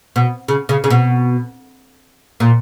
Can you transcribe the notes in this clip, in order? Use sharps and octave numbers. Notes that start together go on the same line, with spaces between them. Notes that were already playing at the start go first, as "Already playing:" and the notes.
B2
C#3
C#3
C#3
B2
A#2